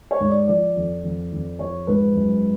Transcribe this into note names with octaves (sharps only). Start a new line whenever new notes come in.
C#5
G#2
D5
F3 D5
F2
F2
F2
F3 C#5
G#2 B4
F#2